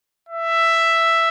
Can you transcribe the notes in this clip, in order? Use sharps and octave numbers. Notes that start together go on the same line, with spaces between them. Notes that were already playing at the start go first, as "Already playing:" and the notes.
E5